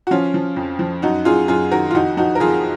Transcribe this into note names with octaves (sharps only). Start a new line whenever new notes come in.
F#4
F3 C#4 F4
F3
F2
F3
F#2 D#4 F#4
F#2 F4 G#4
F#2 F4 G#4
D#3 F#4 A#4
F4
F2 D#4 F#4
F3 D#4 F#4
A#4
F2 F4 G#4